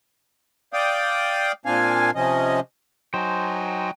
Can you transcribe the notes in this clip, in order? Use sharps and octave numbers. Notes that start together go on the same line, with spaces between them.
D5 F5 G5 D#6
A#2 C4 D4 F5 G#5
C3 F3 C#4 D#5
F#3 D#4 C5 G5 G#5